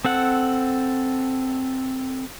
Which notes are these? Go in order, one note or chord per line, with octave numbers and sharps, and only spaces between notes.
C4 A4 F#5